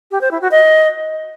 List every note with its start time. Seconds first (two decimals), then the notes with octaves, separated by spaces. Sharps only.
0.11 G4
0.21 C5
0.31 E4
0.41 F#4
0.51 D#5